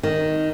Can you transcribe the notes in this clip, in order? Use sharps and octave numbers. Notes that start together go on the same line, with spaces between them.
D#3